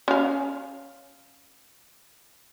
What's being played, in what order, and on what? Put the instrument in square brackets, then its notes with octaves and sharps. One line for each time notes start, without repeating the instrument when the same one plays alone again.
[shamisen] C#4 F5